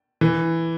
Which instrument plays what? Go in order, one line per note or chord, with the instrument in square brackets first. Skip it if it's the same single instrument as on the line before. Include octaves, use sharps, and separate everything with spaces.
[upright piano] E3